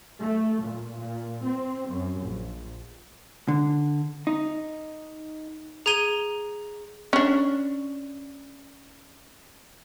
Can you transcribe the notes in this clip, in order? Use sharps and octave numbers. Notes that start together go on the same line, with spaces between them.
A3
A#2
A#2
C4
F#2
A#1
D3
D#4
G#4 A#5 G#6 D#7 G7
C#4 D4